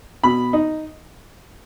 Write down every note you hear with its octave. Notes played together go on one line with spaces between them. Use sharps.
B2 B5
D#4